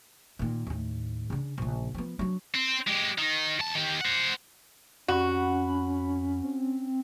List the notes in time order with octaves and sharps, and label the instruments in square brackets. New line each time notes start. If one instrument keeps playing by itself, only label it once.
[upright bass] A#2 D#3
D#2 A2
C#3 D4
A#1 C#3
F3 B3
F#3 D4
[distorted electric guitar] C4
G#3 G4
D#3 D#4
E2 A5
D#3 G4
C5 F#5
[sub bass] F2 [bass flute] C#4 [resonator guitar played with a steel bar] F#4 [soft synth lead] B5
[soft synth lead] C4